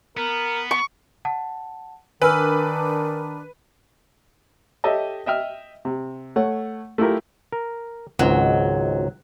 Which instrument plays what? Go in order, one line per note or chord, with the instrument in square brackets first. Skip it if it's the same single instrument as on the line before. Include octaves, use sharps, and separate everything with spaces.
[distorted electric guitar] B3 [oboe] A#4
[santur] C#6
[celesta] F#5 A5
[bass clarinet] D#3 [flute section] D4 A#4 [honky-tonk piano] B4 [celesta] G#5 E6 F6
[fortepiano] G4 A4 C#5 D#5 E5 A5
D#5 E5 G5 F6
C3
A3 C#5 F#5
A3 E4 F4 G4 A#4
[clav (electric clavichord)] A#4
[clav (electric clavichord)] G#1 C#2 G#2 [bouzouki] F#3